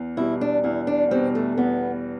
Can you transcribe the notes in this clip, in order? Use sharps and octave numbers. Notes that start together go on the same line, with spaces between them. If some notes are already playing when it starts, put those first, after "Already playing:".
Already playing: E2
B2 G3 E4
D4
E2 E4
D4
B2 G3 C4
A3
E2 B3